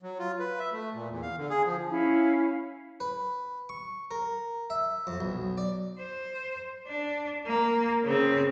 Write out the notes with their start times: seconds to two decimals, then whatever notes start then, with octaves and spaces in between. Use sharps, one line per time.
0.03 F#3
0.19 F4
0.39 B4
0.59 E5
0.73 A3
0.94 A#2
1.09 E2
1.23 F5
1.38 D3
1.50 G#4
1.66 F3
1.90 C#4 E4 F5
3.00 B4
3.69 C#6
4.11 A#4
4.70 E5
5.07 F2
5.20 B1
5.58 D5
5.99 C5
6.88 D4
7.46 A#3
8.04 C#3 C4